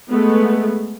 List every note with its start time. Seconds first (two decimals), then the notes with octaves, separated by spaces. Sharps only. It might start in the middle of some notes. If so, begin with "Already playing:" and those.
0.10 G#3 A3 B3